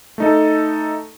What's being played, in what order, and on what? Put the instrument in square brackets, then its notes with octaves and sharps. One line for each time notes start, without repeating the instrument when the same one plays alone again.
[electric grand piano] A3 D#4 A4